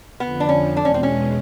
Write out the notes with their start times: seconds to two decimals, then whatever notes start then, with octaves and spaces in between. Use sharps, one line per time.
0.20 F2 D3 F3 B3
0.40 D4
0.49 C#4
0.76 E2 B2 G#3 D4
0.85 C#4
0.94 C4
1.03 C#4